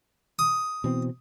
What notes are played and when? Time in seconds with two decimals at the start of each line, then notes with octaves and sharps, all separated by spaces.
0.39 D#6
0.84 B2 E3 C4